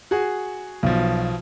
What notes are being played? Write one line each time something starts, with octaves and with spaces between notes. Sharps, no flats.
F#4 G#4
B1 B2 F3